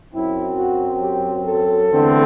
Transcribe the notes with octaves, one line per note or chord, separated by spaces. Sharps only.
F#2 F#3 C4 E4
F#4
G4
A4
E2 D3 A3 C4